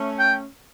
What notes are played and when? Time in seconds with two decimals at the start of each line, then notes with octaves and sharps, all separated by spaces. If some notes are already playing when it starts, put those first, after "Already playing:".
Already playing: A3 C#4
0.19 G5